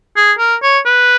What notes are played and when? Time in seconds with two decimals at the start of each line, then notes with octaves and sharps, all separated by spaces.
0.17 G#4
0.39 A#4
0.63 C#5
0.86 B4